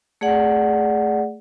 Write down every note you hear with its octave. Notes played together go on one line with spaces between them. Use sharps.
A3 G#4 D5 F#5